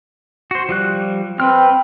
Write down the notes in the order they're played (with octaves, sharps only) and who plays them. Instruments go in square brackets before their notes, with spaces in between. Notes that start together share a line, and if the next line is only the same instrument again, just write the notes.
[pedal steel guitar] F#4 C5
F3 G3 F#6
[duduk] C4 [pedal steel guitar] B4 G5 F6